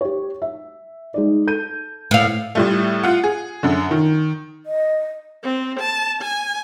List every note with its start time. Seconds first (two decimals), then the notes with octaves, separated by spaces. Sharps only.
0.01 G4 C#5
0.42 E5
1.14 G#3 D#4 D5
1.47 A4 G6 D#7
2.11 A2 F5
2.55 A2 G3 A3
3.03 F4 F#5
3.24 G#4
3.63 F#2 D3
3.91 D#3
4.66 D#5
5.44 C4
5.79 A5
6.22 G#5